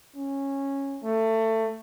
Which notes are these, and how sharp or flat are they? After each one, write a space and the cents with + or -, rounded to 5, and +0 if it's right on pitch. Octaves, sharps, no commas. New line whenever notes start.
C#4 -10
A3 +20